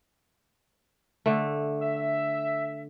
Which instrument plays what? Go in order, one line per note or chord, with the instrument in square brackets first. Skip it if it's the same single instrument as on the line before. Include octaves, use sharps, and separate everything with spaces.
[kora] D3 A3
[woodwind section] E5